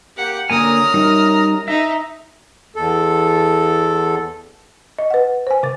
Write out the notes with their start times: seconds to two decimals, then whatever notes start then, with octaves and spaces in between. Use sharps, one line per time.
0.17 A#3 G4 F#5
0.50 F#2 D3 A#3 G#5 A#5 D#6 F6
0.94 G3 D#4 A#4
1.68 D#4 E5
2.76 E2 A4
4.99 D#5
5.10 B4 F#5
5.47 C5 G#5
5.63 C3 A6